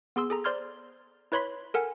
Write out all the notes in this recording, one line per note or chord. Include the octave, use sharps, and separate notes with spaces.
B3 G#4 C6 E6
G#4 A4 A#5
C5 D5 C6 F6 G#6
E4 B4 C#5 B5 C6 B6
A4 A#4 F#5 G#5